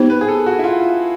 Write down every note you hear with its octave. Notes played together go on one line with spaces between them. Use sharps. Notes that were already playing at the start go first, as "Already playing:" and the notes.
Already playing: B3 D#4 G4 C5
B4
G#4
A4
F#4
E4
F4